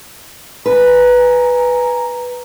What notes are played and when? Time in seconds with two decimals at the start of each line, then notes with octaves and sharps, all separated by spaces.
0.66 B4 G#5 A#5